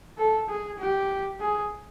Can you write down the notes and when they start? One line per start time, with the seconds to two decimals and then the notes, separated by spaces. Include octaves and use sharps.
0.18 A4
0.49 G#4
0.79 G4
1.40 G#4